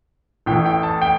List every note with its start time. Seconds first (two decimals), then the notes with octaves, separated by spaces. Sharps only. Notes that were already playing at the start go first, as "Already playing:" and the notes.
0.46 A1 A2 E3 G5
0.66 G5
0.83 A5
1.02 G5